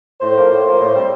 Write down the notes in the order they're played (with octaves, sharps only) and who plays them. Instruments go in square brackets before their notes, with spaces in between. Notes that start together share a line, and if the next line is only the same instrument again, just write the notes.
[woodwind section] A2 C5
F3 A#3
A2
F3 A#3
A2
G3 C4